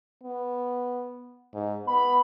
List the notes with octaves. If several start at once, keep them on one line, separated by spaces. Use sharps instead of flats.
B3
G#2
B3 B5